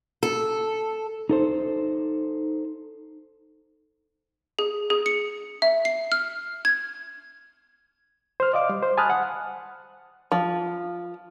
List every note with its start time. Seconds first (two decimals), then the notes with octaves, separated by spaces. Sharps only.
0.23 A4
1.29 D#4 A4 C5
4.59 G#4
4.90 G#4
5.06 C#7
5.62 E5
5.85 C7
6.12 F6
6.65 G#6
8.40 C5 F6
8.53 D5 D#5 F5 D6
8.69 G3
8.83 C5
8.97 G#5 A5 B5 D#6 F6 F#6
9.10 F#5
10.32 F3